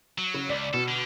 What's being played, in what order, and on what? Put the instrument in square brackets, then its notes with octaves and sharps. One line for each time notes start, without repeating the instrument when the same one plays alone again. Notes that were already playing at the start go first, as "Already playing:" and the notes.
[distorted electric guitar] F#3
[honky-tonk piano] C#3
[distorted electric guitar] C#2 [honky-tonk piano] D5 B6
[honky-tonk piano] B2 [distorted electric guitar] A4
[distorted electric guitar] D3